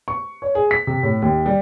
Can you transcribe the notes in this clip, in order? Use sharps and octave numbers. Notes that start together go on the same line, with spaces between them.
C#6
C#5
G#4
B6
C3
A2
D#2
G3